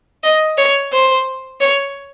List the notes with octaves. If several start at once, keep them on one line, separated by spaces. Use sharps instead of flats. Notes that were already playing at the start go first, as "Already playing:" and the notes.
D#5
C#5
C5
C#5